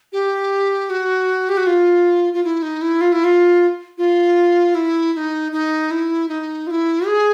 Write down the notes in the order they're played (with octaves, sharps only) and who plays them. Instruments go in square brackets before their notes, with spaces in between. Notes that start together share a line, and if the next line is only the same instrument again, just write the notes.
[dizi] G4
F#4
G4
F#4
F4
F4
E4
D#4
E4
F4
E4
F4
F4
E4
E4
D#4
D#4
E4
D#4
F4
E4
G#4